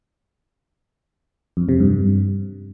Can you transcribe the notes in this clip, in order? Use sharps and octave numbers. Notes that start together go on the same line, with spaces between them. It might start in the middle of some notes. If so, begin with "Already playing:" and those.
F2
C3
G2